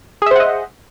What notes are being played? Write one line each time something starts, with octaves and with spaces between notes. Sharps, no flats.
G#4 C5 D#5 E5 F#5